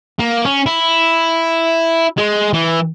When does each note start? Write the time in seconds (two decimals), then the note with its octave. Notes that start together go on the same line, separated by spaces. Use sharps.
0.19 A#3
0.45 C#4
0.66 E4
2.18 G#3
2.54 E3